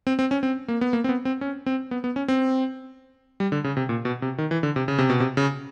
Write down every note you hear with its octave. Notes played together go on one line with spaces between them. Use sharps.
C4
C4
C#4
C4
A#3
B3
A#3
C4
B3
C4
C#4
C4
B3
B3
C#4
C4
G3
D3
C#3
C3
A#2
B2
C3
D#3
E3
D3
C3
C#3
C3
B2
C3
C#3